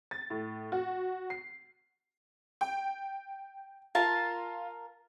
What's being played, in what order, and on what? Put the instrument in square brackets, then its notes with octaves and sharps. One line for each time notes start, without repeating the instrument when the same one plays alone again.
[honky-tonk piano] A6
A2
F#4
C7
G5
[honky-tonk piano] F4 [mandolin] A#4 A5